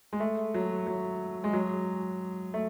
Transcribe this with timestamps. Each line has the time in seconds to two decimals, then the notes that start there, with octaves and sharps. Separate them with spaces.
0.13 G#3
0.20 A3
0.54 F#3
0.87 F#3
1.44 G#3
1.53 F#3
2.54 A3